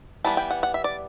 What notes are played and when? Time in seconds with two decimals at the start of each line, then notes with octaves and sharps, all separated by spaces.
0.24 E3 G3 B3 A5
0.37 G5
0.50 F#5
0.63 F#5
0.74 E5
0.84 D5